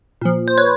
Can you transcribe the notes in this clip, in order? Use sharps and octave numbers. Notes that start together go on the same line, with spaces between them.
A#2 F3
C5
B4 C#5